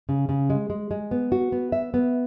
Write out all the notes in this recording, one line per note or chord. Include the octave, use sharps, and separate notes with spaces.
C#3
C#3
G#3
G#3
G#3
B3
F#4
B3
E5
B3